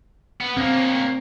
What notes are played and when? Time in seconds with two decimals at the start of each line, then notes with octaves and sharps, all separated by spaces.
0.41 B3
0.57 A#3 C4 C#4